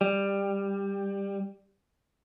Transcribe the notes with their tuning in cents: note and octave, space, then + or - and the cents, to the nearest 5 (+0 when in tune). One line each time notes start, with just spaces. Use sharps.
G3 +15